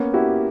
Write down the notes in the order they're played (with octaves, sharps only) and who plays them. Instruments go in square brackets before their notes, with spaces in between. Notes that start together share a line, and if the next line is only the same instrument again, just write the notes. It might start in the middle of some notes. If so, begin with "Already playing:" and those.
Already playing: [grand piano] A#3 [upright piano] B3 C#4
[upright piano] E4 F#4 [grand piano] G4